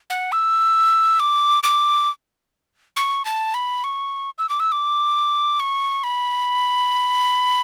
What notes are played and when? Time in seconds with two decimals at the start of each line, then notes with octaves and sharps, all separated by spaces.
0.10 F#5
0.32 E6
1.20 D6
1.63 D6
2.96 C#6
3.25 A5
3.54 B5
3.84 C#6
4.38 E6
4.49 D6
4.60 E6
4.72 D6
5.60 C#6
6.04 B5